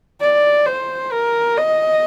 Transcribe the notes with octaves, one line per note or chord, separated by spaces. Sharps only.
D5
C5
A#4
D#5